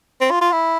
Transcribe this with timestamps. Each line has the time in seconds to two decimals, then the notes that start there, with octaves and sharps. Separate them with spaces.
0.21 C4
0.31 F4
0.41 F4
0.52 E4